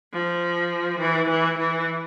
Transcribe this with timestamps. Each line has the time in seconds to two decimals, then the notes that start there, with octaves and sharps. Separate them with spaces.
0.13 F3
1.00 E3
1.30 E3
1.58 E3